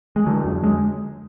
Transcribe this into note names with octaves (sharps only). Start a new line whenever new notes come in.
G#3
D3 F#3
F2
G#3